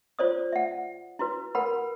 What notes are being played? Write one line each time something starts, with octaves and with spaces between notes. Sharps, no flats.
F4 C5 D5 D#6
E5 F#5
E4 F#4 B4
A#4 B4 F#5 B5